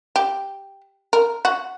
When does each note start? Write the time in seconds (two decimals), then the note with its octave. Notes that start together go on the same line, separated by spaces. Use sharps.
0.16 G4
1.13 A#4
1.45 F#4